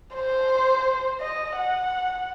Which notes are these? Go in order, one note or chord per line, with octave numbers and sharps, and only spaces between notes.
C5
D#5
F#5